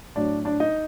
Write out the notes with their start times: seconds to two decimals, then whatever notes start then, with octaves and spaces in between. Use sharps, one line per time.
0.16 A2 F#3 D4 D5
0.45 D4 D5
0.60 D#4 D#5